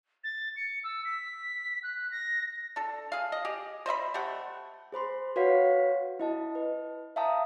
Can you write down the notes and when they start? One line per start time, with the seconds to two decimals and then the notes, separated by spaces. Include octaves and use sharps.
0.24 A6
0.57 C#7
0.84 E6
1.05 B6
1.83 F#6
2.11 A#6
2.76 D4 A4
3.12 G#4 F5
3.32 D#5
3.45 G4 G#4
3.86 C5 D#5 E5 B5
4.14 G3 A3 G4 F#5
4.92 G#4 C5 B5 C6
5.36 F#4 B4 C#5 F5 F#5 B6
6.20 E4 D#5 A5
6.55 B4
7.16 E5 F5 G5 A5 A#5 D#6